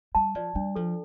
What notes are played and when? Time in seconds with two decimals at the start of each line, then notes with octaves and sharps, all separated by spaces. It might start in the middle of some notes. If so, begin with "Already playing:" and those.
0.15 G3 A5
0.35 F3 D5
0.55 G3 D4
0.76 F3 A4